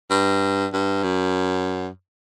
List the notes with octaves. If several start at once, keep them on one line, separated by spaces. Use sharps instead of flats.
G2
G2
F#2